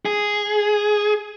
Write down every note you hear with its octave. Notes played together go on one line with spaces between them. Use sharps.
G#4